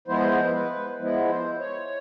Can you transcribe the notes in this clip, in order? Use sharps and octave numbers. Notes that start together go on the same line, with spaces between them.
F3 G#3 B3 E4 C5
B4
F3 G#3 B3 E4
C5
C#5